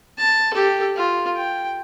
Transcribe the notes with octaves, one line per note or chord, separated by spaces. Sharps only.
A5
G4 A4
F4
G5